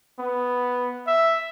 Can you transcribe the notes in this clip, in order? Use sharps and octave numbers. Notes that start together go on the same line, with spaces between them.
B3
E5